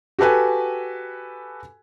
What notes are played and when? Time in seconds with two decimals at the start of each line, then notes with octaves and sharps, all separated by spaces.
0.19 F#4 G4 A4 B4 G#5